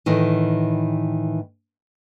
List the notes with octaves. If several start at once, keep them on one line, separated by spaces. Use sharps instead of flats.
A2 D#3 E3